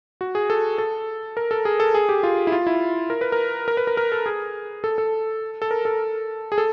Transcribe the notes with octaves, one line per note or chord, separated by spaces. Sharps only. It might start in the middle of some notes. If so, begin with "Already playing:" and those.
F#4
G#4
A4
A4
A#4
A4
G#4
A4
G#4
G4
F4
E4
F4
E4
A#4
B4
A#4
A#4
B4
A#4
A#4
A4
G#4
A4
A4
A4
A#4
A4
G#4
A4